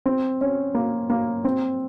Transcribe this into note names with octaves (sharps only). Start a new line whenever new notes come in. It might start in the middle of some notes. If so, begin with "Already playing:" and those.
C4
C#4
A#3
A#3
C4